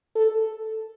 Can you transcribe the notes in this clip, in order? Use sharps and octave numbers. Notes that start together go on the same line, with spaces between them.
A4